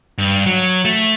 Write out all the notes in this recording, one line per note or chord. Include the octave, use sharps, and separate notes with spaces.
G2
F#3
A3